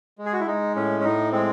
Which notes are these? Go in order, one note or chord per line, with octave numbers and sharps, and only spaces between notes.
G#3
G#4
F#4
E4
G#3 D#4
A2 C#4
C#4
A2 D#4
G#3 C4